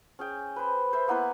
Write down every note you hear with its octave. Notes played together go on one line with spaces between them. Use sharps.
C#4 G#4 G5
B4 C5
C5 E5
A#3 B3 E4 B4